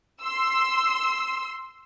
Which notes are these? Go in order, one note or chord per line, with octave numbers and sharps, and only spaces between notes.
C6 E6